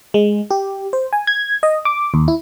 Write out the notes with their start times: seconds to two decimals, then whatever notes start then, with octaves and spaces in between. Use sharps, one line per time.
0.14 G#3
0.51 G4
0.93 C5
1.13 G#5
1.27 G#6
1.63 D#5
1.85 D6
2.14 D#2
2.28 E4